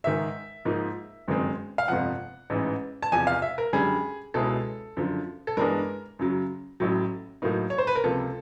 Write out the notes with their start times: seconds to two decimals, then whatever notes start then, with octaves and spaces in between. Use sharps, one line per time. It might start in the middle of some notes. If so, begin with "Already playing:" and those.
0.04 G#2 D#3 G#3 E5
0.65 G#2 F3 A#3 D#4
1.28 G1 F#2 D#3 G#3 C4
1.78 F5
1.88 G1 F2 C3 F3 F#5
2.50 A1 G#2 E3
3.03 A5
3.12 E2 C3 F3 G#5
3.27 F5
3.42 E5
3.58 A#4
3.73 F#2 D3 G3 G#4
4.34 C#2 B2 G#3 C#4 E4 A4
4.97 F#2 D3 F3
5.47 A4
5.57 G2 E3 G#3 B3 D4 A#4
6.19 F#2 C#3 F#3
6.80 A1 A2 F#3
7.42 A2 F#3 A#3 D#4
7.70 C#5
7.78 C5
7.87 B4
7.95 A#4
8.04 C#2 C3 F3 A#3 A4